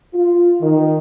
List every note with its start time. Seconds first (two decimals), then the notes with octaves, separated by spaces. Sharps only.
0.14 F4
0.61 D#3